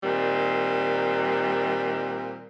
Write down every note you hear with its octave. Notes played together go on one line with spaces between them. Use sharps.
A#2 D#3 G3 C4